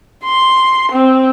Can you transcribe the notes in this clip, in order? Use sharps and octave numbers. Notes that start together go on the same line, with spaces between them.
C6
C4